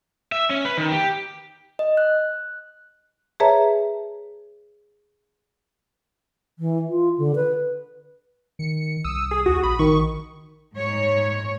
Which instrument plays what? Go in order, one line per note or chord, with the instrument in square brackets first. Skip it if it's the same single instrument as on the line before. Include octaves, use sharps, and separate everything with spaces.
[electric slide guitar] E5
C#4
B4
D#3
G4
[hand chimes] D#5
F#6
[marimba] G#4 B4 C#5 E5 A5 A#5
[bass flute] E3
F4
D3
B4
[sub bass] D#3 [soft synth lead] C#7
[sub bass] C2 [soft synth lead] D#6 [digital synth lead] E6
[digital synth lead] G#4
[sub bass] D#2 [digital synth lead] F#4
[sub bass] A#1 [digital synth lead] B5
[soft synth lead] D#3 [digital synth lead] C#6
[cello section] G#2 C#5